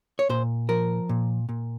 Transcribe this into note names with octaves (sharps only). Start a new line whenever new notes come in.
C#5
A#2 C5
F3 A#4
A#2
A#2